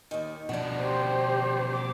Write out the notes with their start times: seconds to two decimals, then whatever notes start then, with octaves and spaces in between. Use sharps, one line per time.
0.11 D#2 D#3
0.49 B2 F3 D4 F#5
0.76 G4 C5
1.72 D6